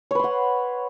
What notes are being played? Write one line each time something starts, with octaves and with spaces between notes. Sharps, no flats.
B4 C#5 F#5 C6